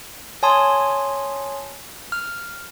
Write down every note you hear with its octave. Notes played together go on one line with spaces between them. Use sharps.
C#5 G#5 A5 C6 D#6
F6